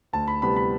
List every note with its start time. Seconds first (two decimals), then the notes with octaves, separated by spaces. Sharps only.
0.13 D2 A5
0.28 B5
0.42 C3 G3 B3 B5
0.56 B5